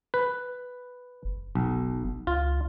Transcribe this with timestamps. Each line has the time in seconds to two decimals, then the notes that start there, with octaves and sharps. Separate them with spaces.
0.14 B4
1.25 F#1
1.55 B1
2.27 C#2 F4